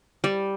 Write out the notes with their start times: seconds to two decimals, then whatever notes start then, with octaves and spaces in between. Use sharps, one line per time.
0.24 G3